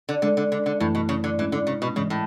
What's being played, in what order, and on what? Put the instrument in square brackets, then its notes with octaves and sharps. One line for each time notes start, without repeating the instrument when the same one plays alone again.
[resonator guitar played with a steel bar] D3
[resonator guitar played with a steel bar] D3 [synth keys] G#3 D4 A4
[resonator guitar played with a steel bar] D3
D3
D3
[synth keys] F#2 E3 A3 E4 [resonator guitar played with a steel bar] A2
[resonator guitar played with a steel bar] B2
C#3
D3
[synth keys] G#2 G#3 C#4 E4 [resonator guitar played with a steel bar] E3
[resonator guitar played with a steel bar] D3
C#3
B2
[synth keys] G#2 E3 G#3 [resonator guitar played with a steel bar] C#3
[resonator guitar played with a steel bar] A2